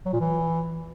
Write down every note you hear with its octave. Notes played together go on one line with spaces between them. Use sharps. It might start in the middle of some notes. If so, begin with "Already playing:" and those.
F#3
A#2
E3